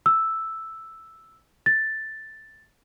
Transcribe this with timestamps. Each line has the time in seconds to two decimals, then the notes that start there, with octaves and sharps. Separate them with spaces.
0.06 E6
1.66 A6